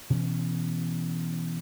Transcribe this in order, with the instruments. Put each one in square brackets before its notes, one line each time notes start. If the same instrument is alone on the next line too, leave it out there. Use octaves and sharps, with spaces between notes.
[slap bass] B2 E3 C#4